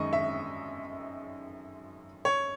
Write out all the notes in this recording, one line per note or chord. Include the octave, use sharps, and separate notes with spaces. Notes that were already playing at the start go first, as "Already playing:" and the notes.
Already playing: F#2 D#3 G#3 D#5 C#6
E5
C#5